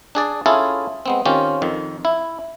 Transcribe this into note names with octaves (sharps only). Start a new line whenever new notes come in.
D4 G#4 D5
C#4 E4 F4 G#4 A4
G#3 B3 C4
D#3 C4 C#4 F4 G4
F2 D#3
E4